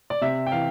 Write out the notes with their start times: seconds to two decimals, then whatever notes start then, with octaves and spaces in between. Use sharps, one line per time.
0.10 D5
0.21 C3 E5
0.46 G5
0.52 E3 F5